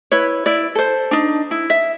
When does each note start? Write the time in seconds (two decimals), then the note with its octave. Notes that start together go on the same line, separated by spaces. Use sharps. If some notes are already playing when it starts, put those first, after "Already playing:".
0.11 E4 B4 C#5
0.46 E4 D5
0.75 A4 C5
1.11 D4 D#4
1.51 E4
1.70 E5